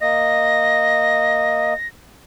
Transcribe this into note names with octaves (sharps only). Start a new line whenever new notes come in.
A#3 D#5 A#6